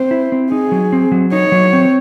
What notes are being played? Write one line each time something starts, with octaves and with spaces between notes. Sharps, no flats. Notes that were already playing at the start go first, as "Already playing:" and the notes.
Already playing: C4 C5
E4
C4
D#4 G#4
F#3
C4
F#3
D#4 C#5
F#3
C4